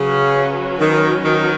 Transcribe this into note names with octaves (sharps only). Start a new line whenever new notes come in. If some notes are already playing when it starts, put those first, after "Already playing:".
Already playing: C#3 F#3 C#4 F#4 B4
D#3
D#3